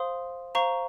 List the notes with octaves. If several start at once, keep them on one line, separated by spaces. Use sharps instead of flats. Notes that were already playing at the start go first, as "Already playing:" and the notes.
Already playing: C5 F5 C6 D#6
C5 F5 A#5 C#6